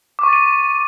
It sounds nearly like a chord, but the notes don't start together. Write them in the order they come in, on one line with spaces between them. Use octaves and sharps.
D6 C#6 A6 D#7